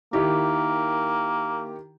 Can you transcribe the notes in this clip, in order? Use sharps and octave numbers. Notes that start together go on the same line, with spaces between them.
D#3 A#3 E4 G4